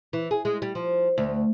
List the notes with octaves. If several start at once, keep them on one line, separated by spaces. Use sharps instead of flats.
E3
G#4
G#3
G3
F3
D2